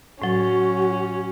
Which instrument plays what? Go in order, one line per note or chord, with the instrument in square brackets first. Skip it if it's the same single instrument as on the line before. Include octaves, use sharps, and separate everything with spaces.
[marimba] A2 F#3 [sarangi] C#4 [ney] F#4